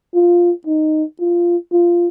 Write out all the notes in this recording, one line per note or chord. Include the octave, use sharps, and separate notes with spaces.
F4
D#4
F4
F4